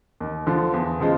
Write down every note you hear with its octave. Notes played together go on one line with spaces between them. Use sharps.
D#2
D3 F3
E2
C#3 F3 G#3